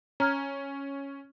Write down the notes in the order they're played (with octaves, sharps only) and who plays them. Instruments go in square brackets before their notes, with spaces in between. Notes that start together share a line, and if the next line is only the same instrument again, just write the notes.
[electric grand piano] C#4 [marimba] A#5 F6 G#6